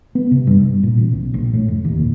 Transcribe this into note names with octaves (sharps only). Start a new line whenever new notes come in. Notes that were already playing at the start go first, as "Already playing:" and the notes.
B3
C3
G2
G2
A#2
A1
B1
A#1
A2
F1
D#2
A#2